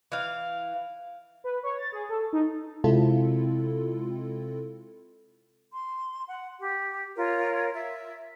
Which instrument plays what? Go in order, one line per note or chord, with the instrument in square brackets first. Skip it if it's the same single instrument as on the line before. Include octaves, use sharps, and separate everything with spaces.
[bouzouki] E3 F5
[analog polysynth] B4
C#5
A6
G#4
A4
D#4
[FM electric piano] C3 G#3 C4 E4 F4 A4
[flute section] C6
F#5
G4
F4 A#4 C#5
E5